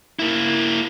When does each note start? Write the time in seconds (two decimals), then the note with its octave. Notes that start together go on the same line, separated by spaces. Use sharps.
0.19 A#3 E4